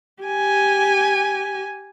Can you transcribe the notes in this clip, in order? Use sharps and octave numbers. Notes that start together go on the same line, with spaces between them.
G4 G#5